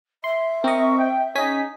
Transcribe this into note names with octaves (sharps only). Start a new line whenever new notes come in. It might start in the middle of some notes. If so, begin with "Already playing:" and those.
E5 C6
C4 A#4 D#5 C#6
G5
C#4 D#4 G#4 D#5 G#5 B6